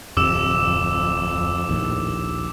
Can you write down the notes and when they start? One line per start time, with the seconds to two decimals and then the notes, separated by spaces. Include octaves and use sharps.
0.17 D1 F2 C3 D6 E6 E7
1.69 A#1 D#2 A2